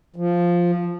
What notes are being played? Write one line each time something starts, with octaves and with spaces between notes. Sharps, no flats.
F3